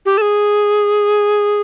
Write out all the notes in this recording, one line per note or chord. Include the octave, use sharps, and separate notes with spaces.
G4
A4
G#4